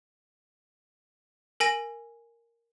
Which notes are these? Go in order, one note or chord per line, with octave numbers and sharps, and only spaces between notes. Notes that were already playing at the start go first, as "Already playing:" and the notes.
A#4 G#5 A#6 D#7